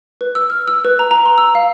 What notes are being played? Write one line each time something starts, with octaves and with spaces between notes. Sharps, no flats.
B4
E6
F6
E6
B4
A#5
A#5
C6
E6
F5